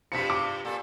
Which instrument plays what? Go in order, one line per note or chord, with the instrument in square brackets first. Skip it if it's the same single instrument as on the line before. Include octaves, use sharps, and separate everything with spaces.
[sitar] G2 C3 F3 [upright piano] B6 C#7
[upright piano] D6
[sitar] A#2 A4